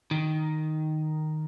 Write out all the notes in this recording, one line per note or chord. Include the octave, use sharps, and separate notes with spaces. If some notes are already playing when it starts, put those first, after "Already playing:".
D#3